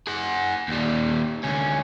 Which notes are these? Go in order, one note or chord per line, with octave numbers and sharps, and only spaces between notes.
G#4 F#5
D#2 G3
D2 C#4